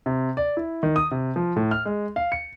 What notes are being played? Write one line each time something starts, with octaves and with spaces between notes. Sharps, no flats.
C3
D5
E4
D#3
D#6
C3
F3
A2
F6
G#3
F5
C#7